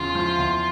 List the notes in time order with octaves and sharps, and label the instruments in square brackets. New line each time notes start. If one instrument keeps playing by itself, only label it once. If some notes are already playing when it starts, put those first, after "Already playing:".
Already playing: [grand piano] E2 C#3 [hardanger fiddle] F4
[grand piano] F3
E2